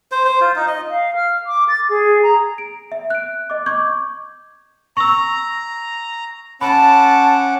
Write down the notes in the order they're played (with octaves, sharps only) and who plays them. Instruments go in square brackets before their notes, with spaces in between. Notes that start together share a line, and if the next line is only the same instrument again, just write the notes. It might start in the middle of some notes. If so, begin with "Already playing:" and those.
[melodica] C5
C5
F4
D#4
D#5
[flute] F5
F6
D6
A6
G#4
A#5
[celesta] D7
E5
F#6 D7
D#5 D6
C#6 D6 G6 G#6
[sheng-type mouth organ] A#5 [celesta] C#6 E6
[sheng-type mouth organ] C#4 F#5 D6 [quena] A5 [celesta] B5